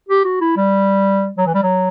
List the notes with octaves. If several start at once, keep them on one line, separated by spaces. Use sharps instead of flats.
G4
F#4
E4
G3
F#3
E3
G3
F#3